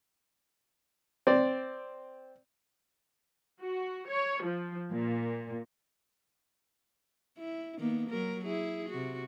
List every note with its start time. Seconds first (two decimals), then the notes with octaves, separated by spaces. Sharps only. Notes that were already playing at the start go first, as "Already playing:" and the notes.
1.27 C4 D5
3.62 F#4
4.09 C#5
4.45 F3
4.93 A#2
7.38 E4
7.78 D#3 A#3 B3
8.10 F#3 A#4
8.45 E4 G#4
8.90 C3 F#4